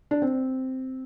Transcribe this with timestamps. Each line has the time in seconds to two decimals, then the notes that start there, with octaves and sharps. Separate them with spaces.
0.11 D4
0.22 C4